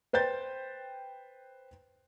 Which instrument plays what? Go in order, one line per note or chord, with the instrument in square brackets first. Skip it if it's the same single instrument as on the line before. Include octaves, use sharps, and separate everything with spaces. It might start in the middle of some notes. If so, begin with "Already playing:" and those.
[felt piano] B4 C5 G5 G6 A6